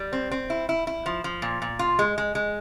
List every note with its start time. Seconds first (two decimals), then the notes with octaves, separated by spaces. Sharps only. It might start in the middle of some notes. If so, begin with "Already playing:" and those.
Already playing: G3
0.13 C4
0.31 C4
0.50 E4
0.69 E4
0.87 E4
1.06 F3
1.24 F3
1.42 A#2
1.62 A#2
1.79 F4
1.99 G#3
2.18 G#3
2.35 G#3